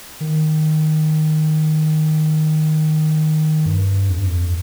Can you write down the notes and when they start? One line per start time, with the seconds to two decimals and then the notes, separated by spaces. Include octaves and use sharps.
0.20 D#3
3.66 G2
4.09 F2
4.18 G2
4.26 F2